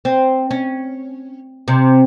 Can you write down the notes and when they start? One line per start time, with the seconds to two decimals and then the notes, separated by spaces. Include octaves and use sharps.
0.05 C4
0.51 C#4
1.68 C3